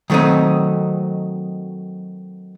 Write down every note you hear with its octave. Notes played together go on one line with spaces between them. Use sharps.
D#3 F#3 A3 C4 D#4